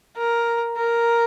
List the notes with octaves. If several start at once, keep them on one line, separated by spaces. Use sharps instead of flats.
A#4
A#4